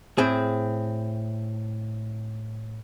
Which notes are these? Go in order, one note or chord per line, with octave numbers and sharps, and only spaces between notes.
A2 C4 G#4